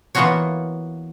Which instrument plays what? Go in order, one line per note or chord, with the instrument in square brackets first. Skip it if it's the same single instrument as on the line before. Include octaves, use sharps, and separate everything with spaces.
[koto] E3 A#3 B3 F4 F#4 C#5